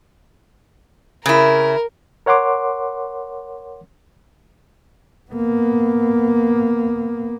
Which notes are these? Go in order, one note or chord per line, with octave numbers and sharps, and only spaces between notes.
C#3 E4 A#4
A#4 C#5 F#5 C6 D6
A#3 B3